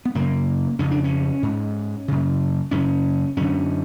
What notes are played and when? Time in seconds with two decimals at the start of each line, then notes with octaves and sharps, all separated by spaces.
0.05 B3
0.15 F#2 C#3 A#3
0.79 F2 C#3 C#4
0.91 D4
1.04 C#4
1.43 G#2
2.08 F#2 C#3
2.71 F#2 C#3 C#4
3.37 F#2 D3 C#4